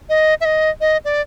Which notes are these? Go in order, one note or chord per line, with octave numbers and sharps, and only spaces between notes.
D#5
E5
D#5
D#5
D5